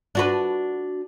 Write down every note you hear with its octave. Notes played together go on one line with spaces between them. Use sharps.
D4 F#4 B4